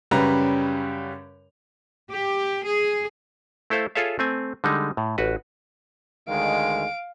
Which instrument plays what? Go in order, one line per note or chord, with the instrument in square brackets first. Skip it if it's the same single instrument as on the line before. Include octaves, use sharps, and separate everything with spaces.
[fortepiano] F#2 C#3 G3 B4 A#5
[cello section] G4
G#4
[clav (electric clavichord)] A3 E4 A4 C5 F5
F4 G#4 A4 C#5 E5 F5
A3 C4 G#5
D3 G3 G#3 D#4
A2
A1 F#4 B4
[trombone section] D2 D#3 G#3 [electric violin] F5 D7